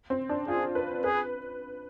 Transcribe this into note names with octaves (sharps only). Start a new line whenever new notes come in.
C4
D4
F4 G#4
B4
G#4 B4